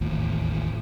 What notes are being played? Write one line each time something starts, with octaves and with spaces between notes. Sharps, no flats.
E1 A1 D#2 A2